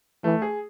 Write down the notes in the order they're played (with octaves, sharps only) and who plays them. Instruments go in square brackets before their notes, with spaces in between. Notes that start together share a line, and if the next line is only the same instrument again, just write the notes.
[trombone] E3 [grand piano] A3
[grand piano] G#4